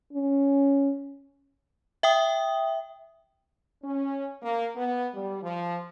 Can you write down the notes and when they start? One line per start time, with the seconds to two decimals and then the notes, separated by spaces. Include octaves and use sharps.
0.13 C#4
2.03 E5 G5 D#6
3.83 C#4
4.43 A#3
4.76 B3
5.14 G3
5.43 F3